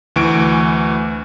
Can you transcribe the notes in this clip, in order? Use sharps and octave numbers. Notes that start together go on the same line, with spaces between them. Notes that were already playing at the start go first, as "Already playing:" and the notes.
D2 E3 C#6 D7